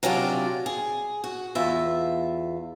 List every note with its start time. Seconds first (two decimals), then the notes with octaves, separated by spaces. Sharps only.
0.03 C3 F#3 C#4 D4 F4 D5
0.66 G#4
1.24 F#4
1.55 E2 F4 E5